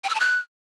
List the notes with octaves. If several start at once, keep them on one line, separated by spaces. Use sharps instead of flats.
G5
E6
A5
F#6